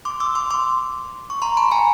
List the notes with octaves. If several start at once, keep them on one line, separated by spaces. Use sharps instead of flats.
C6 D6
D6 E6
C6 D6
C6 D6
C#6
A#5 C6
A5 B5
G#5 A#5